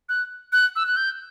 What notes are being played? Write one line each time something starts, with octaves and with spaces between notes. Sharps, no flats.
F#6
F#6
E6
F#6
G6